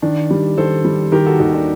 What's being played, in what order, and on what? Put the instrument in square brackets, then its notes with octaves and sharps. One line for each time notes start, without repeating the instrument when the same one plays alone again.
[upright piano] D#3 [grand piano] D4
[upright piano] G3
[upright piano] D#3 [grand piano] A4 C5
[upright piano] G3
[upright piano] D#3 [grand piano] G4 A#4
[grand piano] F#4 A4
[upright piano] D#2 [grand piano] D#4 G4
[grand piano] D4 F#4